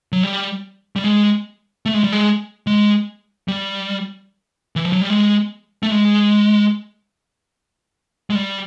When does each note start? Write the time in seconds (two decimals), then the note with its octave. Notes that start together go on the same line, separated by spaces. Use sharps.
0.12 F#3
0.23 G3
0.96 G3
1.04 G#3
1.86 A3
1.94 G#3
2.04 G3
2.13 G#3
2.67 G#3
3.48 G3
4.76 E3
4.85 F3
4.93 F#3
5.02 G3
5.10 G#3
5.83 A3
5.91 G#3
8.30 G#3
8.35 G3